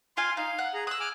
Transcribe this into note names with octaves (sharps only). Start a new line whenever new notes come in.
F4 F5 G#5 C6
D#4 F5
F#5
G#4 A#5
D#6 E6 F#6
G#5 D6 F6